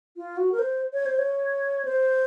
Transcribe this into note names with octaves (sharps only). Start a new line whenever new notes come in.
F4
F#4
A#4
C5
C#5
C5
C#5
C5